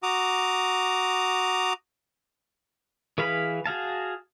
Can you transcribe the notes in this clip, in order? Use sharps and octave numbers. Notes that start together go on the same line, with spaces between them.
F#4 A#5 D6 D#6
E3 G#4 B4 F5 B5
F#4 G#4 F5 A5